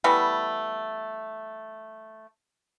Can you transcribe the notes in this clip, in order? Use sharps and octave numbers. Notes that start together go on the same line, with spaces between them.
E3 G3 A3 B3